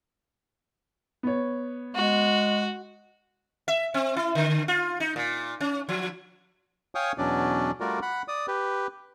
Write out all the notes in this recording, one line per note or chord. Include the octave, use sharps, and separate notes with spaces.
B3 C#5
G#3 F#4
E5
C4
E4
D3
F4
D#4
A#2
C#4
F3
C#5 F5 G5 G#5 C#6 D#6
E2 B2 F#3 C#4 D4 D5
G3 A3 F4 F#4 A#4 D5
F#5 B5
D5 D#6
G4 B4